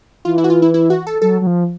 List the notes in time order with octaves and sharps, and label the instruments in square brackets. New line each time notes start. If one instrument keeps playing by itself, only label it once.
[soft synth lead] E3 [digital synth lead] F4
[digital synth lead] E4
F#4
F4
E4
E4
F#4
A4
[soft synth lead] F#3 [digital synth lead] A4
[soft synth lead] F#3
F3